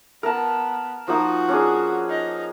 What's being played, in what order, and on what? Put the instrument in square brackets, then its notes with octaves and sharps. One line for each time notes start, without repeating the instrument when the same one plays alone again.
[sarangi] B3 [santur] A#4 A5
[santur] F3 A#3 D#4 [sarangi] F#4
[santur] C#4 D4 G#4
[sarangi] D#4